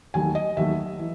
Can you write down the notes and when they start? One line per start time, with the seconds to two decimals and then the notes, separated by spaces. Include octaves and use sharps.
0.14 D#2 D#3 F#3 A3 G#5
0.35 D#5
0.57 D#2 D#3 F#3 A3 E5
0.99 E3